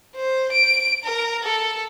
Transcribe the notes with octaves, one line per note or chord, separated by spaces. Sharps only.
C5
D7
A#4
A4